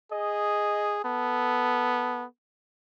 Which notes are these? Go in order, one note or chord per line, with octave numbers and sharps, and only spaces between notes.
G#4 D#5
B3 A4